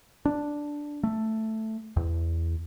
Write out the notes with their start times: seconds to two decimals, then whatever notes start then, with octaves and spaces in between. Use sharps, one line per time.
0.25 D4
1.04 A3
1.97 E2